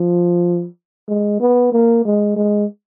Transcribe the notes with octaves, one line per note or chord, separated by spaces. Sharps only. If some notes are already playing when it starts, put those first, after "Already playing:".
Already playing: F3
G#3
B3
A#3
G#3
G#3